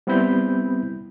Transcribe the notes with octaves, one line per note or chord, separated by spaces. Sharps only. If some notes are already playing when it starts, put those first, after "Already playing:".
G3 B3 C4 E4 B5 G6